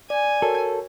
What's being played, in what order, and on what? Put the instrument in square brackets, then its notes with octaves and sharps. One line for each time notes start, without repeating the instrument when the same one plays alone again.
[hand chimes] D5 [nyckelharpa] G#5
[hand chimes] F#4 A#4 C#5 [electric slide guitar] A4